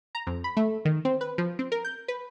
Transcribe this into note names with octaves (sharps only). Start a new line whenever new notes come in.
A#5
F2
B5
A3
D#3
C4
B4
F3
C4
A#4
G6
B4